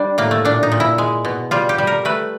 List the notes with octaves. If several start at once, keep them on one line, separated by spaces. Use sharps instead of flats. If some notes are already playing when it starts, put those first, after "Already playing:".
Already playing: G3 D4
A2 A#3
A3
A#2 D4
D#4
A#2
E4
G#3
B2
G3 F4
G4
G3
A#4
A3 B4